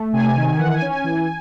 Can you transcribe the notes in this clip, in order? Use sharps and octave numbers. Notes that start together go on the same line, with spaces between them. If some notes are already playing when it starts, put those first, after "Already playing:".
Already playing: A3
C3 G#5
D#3
E3 F#5
G#5
C#4
G#5
E3